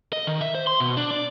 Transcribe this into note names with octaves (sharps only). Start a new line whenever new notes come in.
D#5
D#3
E5
C5
C6
B2
D4
D5